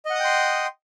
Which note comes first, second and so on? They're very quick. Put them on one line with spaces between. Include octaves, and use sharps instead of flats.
D#5 F#5 D#6 G5 C6